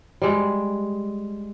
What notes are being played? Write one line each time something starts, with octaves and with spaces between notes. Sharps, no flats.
G3 G#3